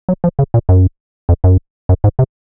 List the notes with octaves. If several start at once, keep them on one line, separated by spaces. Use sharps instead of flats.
F#3
F3
C#3
A#2
F#2
F2
F#2
F#2
G#2
C3